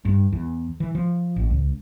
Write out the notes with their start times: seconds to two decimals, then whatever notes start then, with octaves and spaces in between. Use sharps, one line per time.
0.05 G2
0.32 E2
0.80 E3
0.95 F3
1.36 A1
1.51 C#2